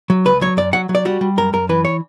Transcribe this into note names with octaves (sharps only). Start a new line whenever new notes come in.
F#3
C#2 B4
F#3 C#5
F#2 D5
F#3 F#5
F#3
D5
G3 F#4
G3
F#2 A#4
F#2 A#4
E3 B4
C#5